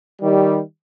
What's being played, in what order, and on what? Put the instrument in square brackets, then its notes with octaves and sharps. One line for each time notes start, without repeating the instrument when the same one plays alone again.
[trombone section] D#3 G3